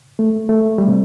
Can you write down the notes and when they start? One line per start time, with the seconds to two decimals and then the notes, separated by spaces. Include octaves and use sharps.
0.19 A3
0.49 A3
0.78 G3
0.88 C3